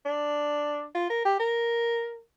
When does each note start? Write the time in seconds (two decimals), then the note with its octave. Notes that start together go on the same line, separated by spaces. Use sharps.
0.06 D4
0.95 F4
1.10 A#4
1.25 G4
1.40 A#4